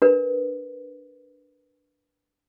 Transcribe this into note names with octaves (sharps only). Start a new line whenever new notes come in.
D4 A#4 B4